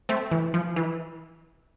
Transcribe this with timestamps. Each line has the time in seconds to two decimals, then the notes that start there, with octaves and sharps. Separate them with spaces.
0.09 A3 C4
0.31 E3
0.54 F3
0.76 E3